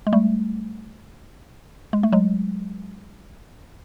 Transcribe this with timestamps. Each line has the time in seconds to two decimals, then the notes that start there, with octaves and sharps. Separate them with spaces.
0.07 G#3
0.13 G3 A3
1.93 G#3
2.03 A3
2.12 F#3 G#3